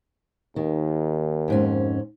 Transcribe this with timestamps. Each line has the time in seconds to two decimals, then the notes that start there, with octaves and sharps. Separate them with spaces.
0.56 D#2 D#3
1.48 F2 G#2 C#4